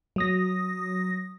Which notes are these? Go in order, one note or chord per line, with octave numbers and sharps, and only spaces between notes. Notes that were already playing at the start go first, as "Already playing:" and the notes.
F#3 D#6 A#6